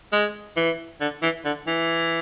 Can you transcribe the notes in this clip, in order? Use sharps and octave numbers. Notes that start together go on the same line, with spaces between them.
G#3
E3
D3
E3
D3
E3